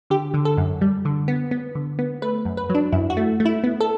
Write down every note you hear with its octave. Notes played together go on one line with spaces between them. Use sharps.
D3 G4
D3
A4
F#2
G3
D3
B3
B3
D3
B3
A3 B4
F#2
B4
F#3
D4
F#2 E4
F#4
A3
A3
E4
B3
A4